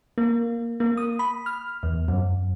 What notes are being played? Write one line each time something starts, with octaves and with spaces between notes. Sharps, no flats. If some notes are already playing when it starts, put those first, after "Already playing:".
A#3
A#3
D#6
B5
F6
E2
F#2